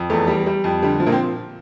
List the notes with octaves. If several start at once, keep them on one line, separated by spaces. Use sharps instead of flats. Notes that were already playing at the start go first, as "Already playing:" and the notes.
Already playing: F2
E2 A3
G3
G3
F2
D3 G3
F3
A#2 A#3
C4